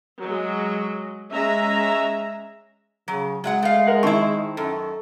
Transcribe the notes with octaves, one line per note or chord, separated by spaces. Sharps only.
F#3 G#3
G#3 C#4 E5 A#5
C#3 F#3
F#3 G#3 F5 F#5
A3 F5
G#4 A#4 F#5
D#3 C4 E4 A5 C#6
F#2 A4